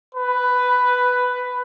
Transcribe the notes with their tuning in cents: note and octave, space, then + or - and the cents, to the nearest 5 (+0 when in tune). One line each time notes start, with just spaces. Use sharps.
B4 +10